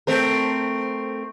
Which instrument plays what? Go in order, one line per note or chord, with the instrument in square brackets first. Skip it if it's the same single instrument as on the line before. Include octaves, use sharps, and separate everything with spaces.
[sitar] A3 C4 A#4